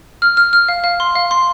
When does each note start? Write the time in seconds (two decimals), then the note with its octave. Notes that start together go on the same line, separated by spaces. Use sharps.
0.22 F6
0.37 F6
0.53 F6
0.68 F5
0.84 F5
1.00 C6
1.15 F5
1.31 C6